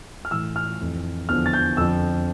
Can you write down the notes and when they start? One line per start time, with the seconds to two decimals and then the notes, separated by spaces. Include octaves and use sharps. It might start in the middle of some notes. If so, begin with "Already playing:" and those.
0.25 F6
0.31 A2 E3 E6
0.56 F6
0.80 F2 E3
1.29 E2 D3 F3 F6
1.46 A6
1.53 G6
1.77 F2 D3 F3 E6